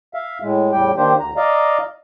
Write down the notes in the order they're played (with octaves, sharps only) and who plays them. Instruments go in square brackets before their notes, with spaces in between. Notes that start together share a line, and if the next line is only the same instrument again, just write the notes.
[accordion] E5 F5
A2 G#3
E2 A2 G3 G4 G5
D#3 A#3 D4 G4 C5
D2 A#5
D5 D#5 F5 A#5